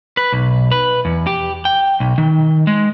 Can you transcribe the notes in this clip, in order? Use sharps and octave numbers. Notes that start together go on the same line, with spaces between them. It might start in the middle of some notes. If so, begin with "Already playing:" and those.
B4
B1
B4
E2
G4
G5
B1
D#3
G#3